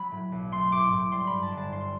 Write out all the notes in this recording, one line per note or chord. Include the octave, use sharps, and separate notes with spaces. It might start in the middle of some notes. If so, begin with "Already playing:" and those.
Already playing: F#3 B5
A2
B1
A3 C6
A2 D6
A2 D6
G3 C6
B5
G2
A5
G1
A5
G2 C6